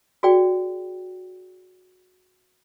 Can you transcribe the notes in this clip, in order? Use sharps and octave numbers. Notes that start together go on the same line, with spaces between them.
F#4 G#4 D5 G5